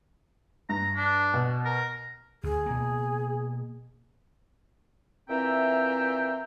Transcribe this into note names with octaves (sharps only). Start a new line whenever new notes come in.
G2 A#5
D4
B2
A#4
D2 G#4
B2 A#3
A#2 E3 C4 E5 G5 A#5